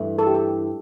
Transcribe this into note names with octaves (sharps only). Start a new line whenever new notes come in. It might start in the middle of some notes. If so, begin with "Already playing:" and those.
Already playing: G2 E3 A3
A4
G4
A4